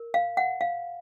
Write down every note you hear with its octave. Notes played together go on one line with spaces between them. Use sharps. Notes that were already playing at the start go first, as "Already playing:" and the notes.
Already playing: A#4
F5
F#5
F5